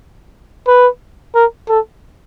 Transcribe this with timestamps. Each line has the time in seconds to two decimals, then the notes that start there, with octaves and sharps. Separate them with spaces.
0.67 B4
1.35 A#4
1.69 A4